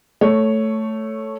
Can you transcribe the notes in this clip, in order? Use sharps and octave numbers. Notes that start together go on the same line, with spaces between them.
A3 C#5